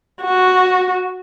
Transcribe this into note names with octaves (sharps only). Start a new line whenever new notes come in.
F#4